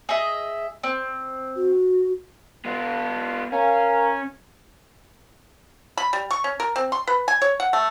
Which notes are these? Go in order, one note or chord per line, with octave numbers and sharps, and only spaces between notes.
G#4 D#5 E5
C4
F#4
B3 F4
C#4 A#4 F5 G#5
B5
G3
C#6
C#4
A#4
C4
C6
B4
G#5
C#5
F#5
A3